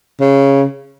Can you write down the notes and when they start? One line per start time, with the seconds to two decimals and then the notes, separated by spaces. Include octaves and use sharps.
0.20 C#3